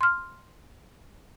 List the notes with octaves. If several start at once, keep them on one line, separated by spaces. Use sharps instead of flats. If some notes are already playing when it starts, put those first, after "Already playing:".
C6 F6